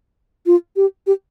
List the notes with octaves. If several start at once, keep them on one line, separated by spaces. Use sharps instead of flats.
F4
G4
G4